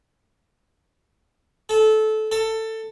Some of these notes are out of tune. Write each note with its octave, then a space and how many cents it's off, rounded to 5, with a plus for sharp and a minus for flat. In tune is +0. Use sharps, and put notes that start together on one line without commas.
A4 -20
A4 +15